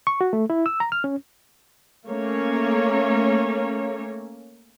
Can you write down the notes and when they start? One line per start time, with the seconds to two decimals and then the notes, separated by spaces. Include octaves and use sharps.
0.07 C#6
0.21 F#4
0.33 A3
0.50 E4
0.66 E6
0.80 A#5
0.92 F6
1.04 C#4
2.08 A3 A#3 C#4 C#5